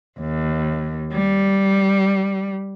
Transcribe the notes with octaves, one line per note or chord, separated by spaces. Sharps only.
D#2
G3